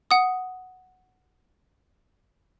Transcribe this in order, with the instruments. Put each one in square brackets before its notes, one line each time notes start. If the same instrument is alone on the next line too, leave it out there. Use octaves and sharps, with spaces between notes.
[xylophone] F#5 D#6